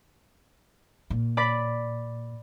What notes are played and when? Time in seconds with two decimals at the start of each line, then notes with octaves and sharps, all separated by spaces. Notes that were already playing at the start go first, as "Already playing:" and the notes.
1.10 A#2
1.37 D5 B5 B6